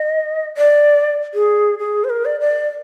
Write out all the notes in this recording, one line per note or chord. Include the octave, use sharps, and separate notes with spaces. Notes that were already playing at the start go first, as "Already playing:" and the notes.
Already playing: D#5
D5
G#4
G#4
C5
A#4
D5
D5